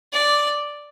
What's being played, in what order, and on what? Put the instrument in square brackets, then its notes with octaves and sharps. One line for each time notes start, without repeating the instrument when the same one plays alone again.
[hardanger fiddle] D5